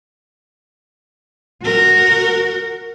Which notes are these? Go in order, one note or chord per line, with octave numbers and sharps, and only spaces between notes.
F#4 A#4